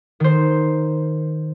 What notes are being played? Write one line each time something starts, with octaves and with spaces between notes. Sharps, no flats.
D#3 C5